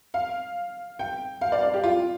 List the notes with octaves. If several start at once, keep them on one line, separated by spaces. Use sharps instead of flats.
F5
G5
F5
D5
D5
G4
F4